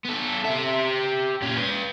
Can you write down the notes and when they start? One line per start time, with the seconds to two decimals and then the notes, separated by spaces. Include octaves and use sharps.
0.05 B3 A4
0.45 G4 E5
1.42 A#2 C#4
1.57 B4 G5